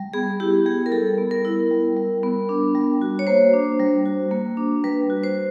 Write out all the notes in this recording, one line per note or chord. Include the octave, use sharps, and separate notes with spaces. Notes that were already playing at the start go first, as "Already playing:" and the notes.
Already playing: G3
B3 G#4
E4 G4
G3 G#4
A#4
G3 A4
B3
A#4
E4
G3
G3
B3
D4
G3
F#4
C#5
A#3 C5
D4
G3
F#4
A#3
D4
G3 B4
F#4
C5